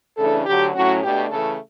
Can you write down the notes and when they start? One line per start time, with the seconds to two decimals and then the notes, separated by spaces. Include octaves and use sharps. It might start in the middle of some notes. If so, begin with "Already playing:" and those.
0.17 C#3 E3 A3 D4 A4
0.45 D2 D3 F#3 G4
0.73 A2 F#3 C#4 F#4
1.02 B2 A3 D4 G4
1.30 C#3 E3 A3 A4